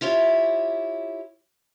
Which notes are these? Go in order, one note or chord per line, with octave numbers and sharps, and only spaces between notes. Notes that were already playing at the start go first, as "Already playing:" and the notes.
E4 F4 G4 C#5